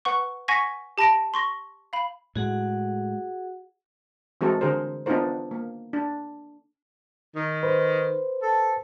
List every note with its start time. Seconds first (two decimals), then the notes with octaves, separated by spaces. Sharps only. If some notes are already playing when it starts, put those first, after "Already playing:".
0.05 B4 F#5 C#6
0.48 F#5 G#5 C#6 G#6 A#6 B6
0.98 G4 A5 B5 A#6 D7
1.34 C6 C#6 A#6
1.93 F5 B5
2.35 A2 G#3 F#4 G#4 F#5
4.41 E3 G#3 C4 F#4 A4 A#4
4.61 D3 G#4 A#4 C5
5.06 B3 D4 D#4 F4 A#4 C5
5.51 A#3
5.93 D4
7.35 D#3
7.63 B4 C5
8.42 A4